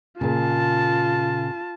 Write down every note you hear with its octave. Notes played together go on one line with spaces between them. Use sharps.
A#2 C#3 F4 A5